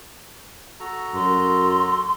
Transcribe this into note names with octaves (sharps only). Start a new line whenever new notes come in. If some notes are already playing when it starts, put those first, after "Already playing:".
F#4 A4 A#5
F#2 C6